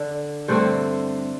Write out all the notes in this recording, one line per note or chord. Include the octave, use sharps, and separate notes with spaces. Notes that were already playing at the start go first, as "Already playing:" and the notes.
Already playing: D3 D4 D5
G2 D3 A3 C4 C5